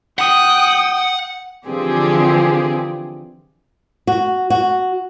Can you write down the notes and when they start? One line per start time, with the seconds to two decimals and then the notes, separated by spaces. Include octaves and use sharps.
0.19 F#5 G5 D#6
1.66 D3 E3 F3 C4 G4 G#4
4.07 F#4
4.50 F#4